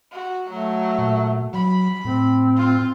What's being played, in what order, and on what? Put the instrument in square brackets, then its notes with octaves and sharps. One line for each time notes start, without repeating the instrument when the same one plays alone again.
[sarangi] F#4
[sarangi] F#3 [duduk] A3
[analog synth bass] A#2
[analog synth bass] F#3 [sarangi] B5
[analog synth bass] A2 [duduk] C4
[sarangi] F4